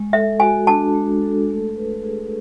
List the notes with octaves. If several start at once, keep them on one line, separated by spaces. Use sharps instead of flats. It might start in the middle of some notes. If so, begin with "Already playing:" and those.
Already playing: G#3
A4 E5
F#4 G#5
D4 A5
G#3
A4
A3
B4
G#4